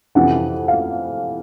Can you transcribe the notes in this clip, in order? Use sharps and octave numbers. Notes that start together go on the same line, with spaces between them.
F2 C3 E3 F#5
F5